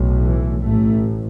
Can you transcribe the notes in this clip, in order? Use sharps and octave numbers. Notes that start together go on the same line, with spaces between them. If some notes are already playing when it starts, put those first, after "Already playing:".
Already playing: B1 A2
E3
A1 A2 A3